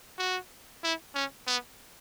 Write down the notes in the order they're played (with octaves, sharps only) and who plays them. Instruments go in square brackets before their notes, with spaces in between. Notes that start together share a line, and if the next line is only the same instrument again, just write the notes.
[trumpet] F#4
E4
C#4
B3